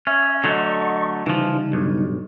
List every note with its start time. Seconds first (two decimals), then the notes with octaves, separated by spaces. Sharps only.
0.07 C#4 E5
0.44 D3 F#3 A3 D#5 C#6
1.26 C#3 E3 F3 G3 D#4
1.73 B1 G2